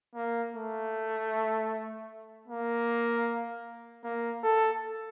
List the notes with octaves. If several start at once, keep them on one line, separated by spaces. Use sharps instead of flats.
A#3
A3
A#3
A#3
A4